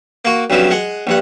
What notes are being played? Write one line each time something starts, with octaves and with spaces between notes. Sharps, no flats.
A#3 F#4
B1 G2 C#3 F3 F#3
G#3 F#5
A#1 G2 F#5